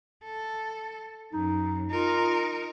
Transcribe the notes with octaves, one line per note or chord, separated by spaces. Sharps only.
A4
F#2 D#4
D#4 F4 A#4